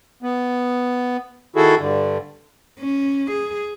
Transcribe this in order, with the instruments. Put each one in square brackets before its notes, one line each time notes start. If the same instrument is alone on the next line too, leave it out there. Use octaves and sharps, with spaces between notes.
[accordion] B3
D#3 E4 F#4 G#4 A4
G2 D3
[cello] C#4
G#4